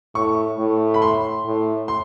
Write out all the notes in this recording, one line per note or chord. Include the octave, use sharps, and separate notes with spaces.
A2 C#6
A2
B5
C6
A2
C6